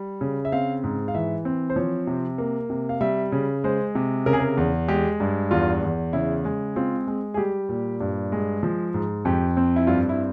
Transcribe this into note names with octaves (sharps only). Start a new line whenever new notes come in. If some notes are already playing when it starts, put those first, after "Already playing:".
Already playing: G3
C#3
E5
C4 F5
G#2
F5
E3 E5
C4
C5
F3 C#5
C3
A#3
C3
F5
G3 E5
C#3
G#3 C5
C3
C#3 A#4
G#4
A#4
E2
G#3 G4
G2
E2 F4
E2
C#3 E4
G#3
C4 F4
G#3
G#4
G3 G4
A#2
G2
G#3
F3
G#2
F2 G4
C4
E4
G2 F4
E4